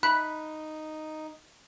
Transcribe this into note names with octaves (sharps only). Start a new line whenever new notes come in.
D#4 B5 F#6